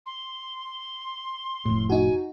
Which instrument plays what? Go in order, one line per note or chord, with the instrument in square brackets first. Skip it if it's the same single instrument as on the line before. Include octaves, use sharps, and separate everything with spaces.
[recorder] C6
[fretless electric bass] F1 A2
[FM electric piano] D#4 F#4 [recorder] G#5